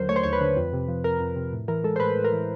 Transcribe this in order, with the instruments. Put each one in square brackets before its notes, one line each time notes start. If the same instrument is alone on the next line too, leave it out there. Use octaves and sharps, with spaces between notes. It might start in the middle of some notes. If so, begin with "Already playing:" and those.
Already playing: [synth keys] D#2 D3 F#3 A#4 C5
A3 C#5
C5
D#2 C#5
B4
D3
F2
C3
F3
F2 A#4
F2
C3
A2
E3 A#4
G#3 A4
C5
A2 B4
A2
A#4
E3